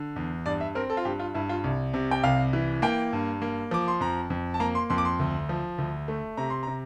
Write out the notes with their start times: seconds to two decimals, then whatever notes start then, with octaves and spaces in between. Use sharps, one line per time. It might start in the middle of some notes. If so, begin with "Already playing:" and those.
Already playing: D3
0.16 E2
0.46 G2 D5
0.61 E5
0.75 C4 A#4
0.90 A4
0.97 F4
1.05 G2 G4
1.20 F4
1.34 G2 E4
1.49 F4
1.64 C2
1.94 C3
2.11 G5
2.23 C2 F5
2.53 E3
2.82 A#3 G5
3.13 G2
3.42 A#3
3.71 F3 D6
3.88 C6
4.01 F2 A#5
4.30 F2
4.54 A5
4.60 A#3 A#5
4.75 C6
4.90 F2 C6
4.98 D6
5.05 C6
5.19 D2
5.49 F3
5.78 D2
6.08 A3
6.37 C3 A#5
6.50 C6
6.63 C3 A#5